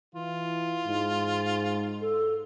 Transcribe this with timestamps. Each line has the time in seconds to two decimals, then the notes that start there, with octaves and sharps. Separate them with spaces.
0.14 E3 F4
0.86 G#2
2.01 A4